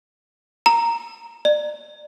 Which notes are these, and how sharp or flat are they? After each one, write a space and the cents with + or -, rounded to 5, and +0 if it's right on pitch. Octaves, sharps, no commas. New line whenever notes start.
A#5 -5
D5 +30